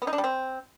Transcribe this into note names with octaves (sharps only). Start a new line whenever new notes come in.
B3
D#4
D4
G3
C4